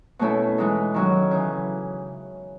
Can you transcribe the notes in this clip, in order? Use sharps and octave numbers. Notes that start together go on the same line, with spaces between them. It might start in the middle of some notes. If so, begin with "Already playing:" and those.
B2 A3 C#4 E4 A4
E3 G#3 D#4 A4
D#3 F#3 C#4 F#4
C#3 E3